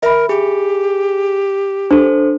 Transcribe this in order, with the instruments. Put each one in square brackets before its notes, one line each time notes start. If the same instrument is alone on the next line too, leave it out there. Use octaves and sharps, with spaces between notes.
[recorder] A#4 [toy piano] E5 B5
[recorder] G4 [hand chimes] G#4
[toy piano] D4 [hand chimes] A4 C5